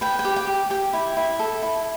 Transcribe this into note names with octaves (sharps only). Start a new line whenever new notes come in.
B4 G5
G5
G4
G5
G4
G4 G5
E4
E4
A4
E4